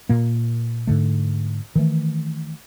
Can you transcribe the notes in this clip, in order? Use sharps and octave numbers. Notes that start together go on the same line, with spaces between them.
A#2 A#3
G#2 D3 A3
D#3 E3 A3